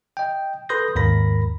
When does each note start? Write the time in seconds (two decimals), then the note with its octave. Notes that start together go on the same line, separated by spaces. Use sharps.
0.17 D#5 G5
0.69 A4 B4 C6 D#6 G6 A#6
0.95 D#2 G#2 A#4 B5 A#6